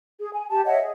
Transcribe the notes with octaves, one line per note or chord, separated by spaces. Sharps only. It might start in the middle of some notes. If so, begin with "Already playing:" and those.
G#4
G#5
G4 A5
C#5 D#5 E5 F#5
G#4